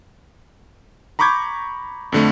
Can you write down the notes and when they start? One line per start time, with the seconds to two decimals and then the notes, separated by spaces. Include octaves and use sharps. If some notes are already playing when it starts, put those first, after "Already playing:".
1.19 A#5 B5 C#6 D6 G6 G#6
2.12 F2 D3 A3